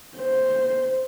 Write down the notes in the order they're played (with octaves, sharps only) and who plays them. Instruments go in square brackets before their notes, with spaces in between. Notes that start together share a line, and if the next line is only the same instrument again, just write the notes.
[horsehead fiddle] C5